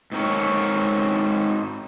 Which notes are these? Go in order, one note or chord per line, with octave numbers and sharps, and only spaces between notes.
G#2 C4 A#4 C#5